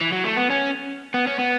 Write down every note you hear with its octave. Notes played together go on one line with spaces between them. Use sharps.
E3
F#3
A3
B3
C#4
B3
C#4
B3